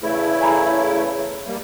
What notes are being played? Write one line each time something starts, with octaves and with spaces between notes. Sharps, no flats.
E2 C#3 A3 E4
G#5 A#5 B5
G3 A#3